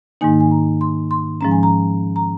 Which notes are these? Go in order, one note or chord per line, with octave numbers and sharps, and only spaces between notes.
G#2 D#3 A#3 D#4 G#5
G#5
A#5
C6
C6
G#2 F3 G#3 C#4 A#5
G#5
A#5
A#5